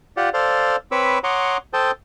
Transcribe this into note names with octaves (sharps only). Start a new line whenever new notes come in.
F4 G4 D5 F#5
A4 C5 D5 F5
C4 B4 C#5 B5 D6 E6
C#5 F#5 A#5 C6 D6 D#6
A4 C5 G5 A5 D#6